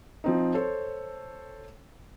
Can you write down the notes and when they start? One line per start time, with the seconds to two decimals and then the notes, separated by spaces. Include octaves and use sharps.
0.24 F3 C4 D#4
0.54 A4 C5 C#5